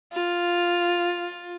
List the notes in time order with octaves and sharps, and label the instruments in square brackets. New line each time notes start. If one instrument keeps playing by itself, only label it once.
[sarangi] F4